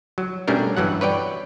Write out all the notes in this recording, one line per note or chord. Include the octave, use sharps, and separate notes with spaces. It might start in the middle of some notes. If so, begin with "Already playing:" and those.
F#3
B2 G3 A3 C#4 D4 A#4
G2 E3 F#3 F#5
B4 C#5 D5 G5